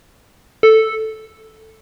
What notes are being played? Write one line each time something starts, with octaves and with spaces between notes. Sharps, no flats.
A4